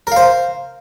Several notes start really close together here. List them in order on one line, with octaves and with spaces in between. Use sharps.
A#4 F5 C5